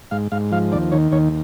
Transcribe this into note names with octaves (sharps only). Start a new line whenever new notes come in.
G#2 F5
G#2 F5
F3 F5
D#2 D5
D#3 C#5
D#2 C#5